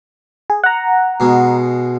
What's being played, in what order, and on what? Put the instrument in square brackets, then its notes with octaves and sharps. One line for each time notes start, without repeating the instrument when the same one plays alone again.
[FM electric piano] G#4
F#5 A#5
[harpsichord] B2 G#3